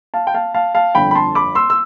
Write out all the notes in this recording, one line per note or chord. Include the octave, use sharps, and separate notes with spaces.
F5 A5
G5
F5 A5
F5 A5
F5 A5
G1 F2 D3 G5 B5
B5
A5 C6
B5 D6
C6 E6
E6